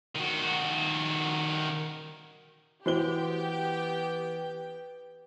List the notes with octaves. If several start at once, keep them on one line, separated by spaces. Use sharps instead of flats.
D#3 F#4
E3 B3 F#4 G4 C5 G5 C6 G7